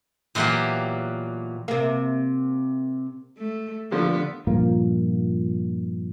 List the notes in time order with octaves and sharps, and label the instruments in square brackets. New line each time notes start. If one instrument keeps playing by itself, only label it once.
[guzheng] A#2 E3 F#3 A#3 B3 G4
[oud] C3 A#3
[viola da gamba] A3
[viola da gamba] D3 B3 [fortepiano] F3 G3 A#3
[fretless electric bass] G2 A#2 F3 A#3